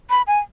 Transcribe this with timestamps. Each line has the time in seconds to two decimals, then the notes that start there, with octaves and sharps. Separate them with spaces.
0.10 B5
0.27 G#5